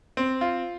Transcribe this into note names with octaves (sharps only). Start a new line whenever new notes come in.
C4
F4